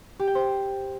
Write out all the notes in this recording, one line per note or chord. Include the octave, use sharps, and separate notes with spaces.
G4
G5
C5